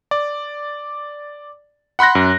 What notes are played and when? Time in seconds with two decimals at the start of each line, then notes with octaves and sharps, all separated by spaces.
0.11 D5
1.99 F#5 B5 C6 F#6 A#6
2.15 F#2